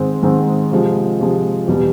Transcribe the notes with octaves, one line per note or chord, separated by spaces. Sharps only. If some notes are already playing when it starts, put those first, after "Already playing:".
Already playing: G#2 D#3 G#3 C4
G#2 D#3 G#3 C4
C3 F3 G#3
C3 F3 G#3
E2 B2 G3